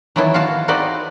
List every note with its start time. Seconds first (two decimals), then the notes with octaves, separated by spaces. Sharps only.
0.16 D#3 E3 F#3 B3 E4 A4
0.34 F4 F#4 F5 A5
0.68 C4 D#4 F#4 B4 D5 D#5